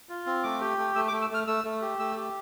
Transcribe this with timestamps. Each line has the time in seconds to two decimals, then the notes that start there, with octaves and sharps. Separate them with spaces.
0.09 F4
0.26 C4
0.43 A3 D6
0.61 G4
0.78 A3
0.95 A3 E6
1.08 D6
1.13 A3
1.22 E6
1.30 A3 F6
1.47 A3 E6
1.64 A3
1.82 G4
1.99 A3 E6
2.17 G4